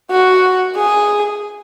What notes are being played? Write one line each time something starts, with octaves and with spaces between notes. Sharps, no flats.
F#4
G#4